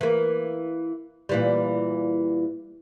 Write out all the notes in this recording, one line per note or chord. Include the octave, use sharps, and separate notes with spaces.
E3 A#3
A#2 E3 G3